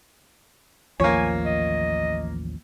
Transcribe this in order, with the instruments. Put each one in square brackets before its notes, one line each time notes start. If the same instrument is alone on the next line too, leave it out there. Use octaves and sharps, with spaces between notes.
[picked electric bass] A1 D#2 F3 [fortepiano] A#3 C#5 [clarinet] G#5
[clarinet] D#5